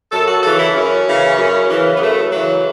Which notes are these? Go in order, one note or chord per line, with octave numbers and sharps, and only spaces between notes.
F#2 A4
F#4
C#3 E3 A4
E4
F#2 C#4
C#3 E3
F#2
C#3 E3
B3
F#2 A3
C#3 E3 F#3